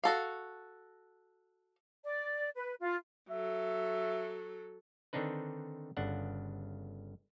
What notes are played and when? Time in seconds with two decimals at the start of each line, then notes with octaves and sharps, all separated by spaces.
0.04 F#4 A4 F5
2.04 D5
2.56 B4
2.81 F4
3.30 F#3 A4 E5
5.13 D3 D#3 C4 D4 D#4 B4
5.97 G1 C#3 D4 F#5